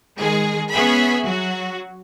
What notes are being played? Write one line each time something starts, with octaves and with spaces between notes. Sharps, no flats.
D#3 G#3 G#4
B3 C#4 G#4 E5 B5
F#3 F#4